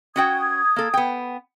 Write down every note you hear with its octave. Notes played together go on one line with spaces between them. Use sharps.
C#4 F#4 G5 D#6 G#6
A#3 A4
B3 G5